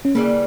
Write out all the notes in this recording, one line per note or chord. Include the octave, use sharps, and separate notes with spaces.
C#4
C#3 E3 G3 A#3